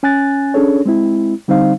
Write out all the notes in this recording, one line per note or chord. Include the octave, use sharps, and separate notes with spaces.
C#4 G#5 F#6 A6
C#4 D4 G#4 A4 C#5
G#3 C4 E4
D3 G3 C4 D#4 C5 F5